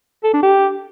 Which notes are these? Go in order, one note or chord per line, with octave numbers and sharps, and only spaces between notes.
A4
D4
G4